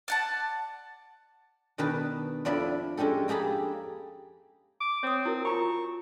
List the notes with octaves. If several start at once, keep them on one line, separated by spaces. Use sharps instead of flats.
D5 F#5 A5
B2 D#3 D4 B4 A5
F2 F3 D4 E4 D5 B5
G#3 C#4 D4 G4 A4
A#3 G4 G#4 A5 B5
D6
C4 C#5 D#6
E4 F#4 A#4
F4 A#5 B5 C#6